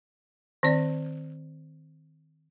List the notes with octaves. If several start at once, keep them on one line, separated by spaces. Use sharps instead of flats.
D#3 C4 D5